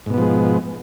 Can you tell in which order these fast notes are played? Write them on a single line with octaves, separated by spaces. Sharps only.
G#2 B2 B3 F3 G#3